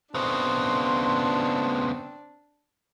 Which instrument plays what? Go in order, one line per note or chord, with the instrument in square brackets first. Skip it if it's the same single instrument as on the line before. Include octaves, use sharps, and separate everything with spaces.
[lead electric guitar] C#3 B3 [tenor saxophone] C4 [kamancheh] D4 [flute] C6